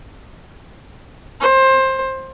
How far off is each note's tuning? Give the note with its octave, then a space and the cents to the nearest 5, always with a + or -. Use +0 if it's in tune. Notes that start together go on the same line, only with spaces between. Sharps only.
C5 +20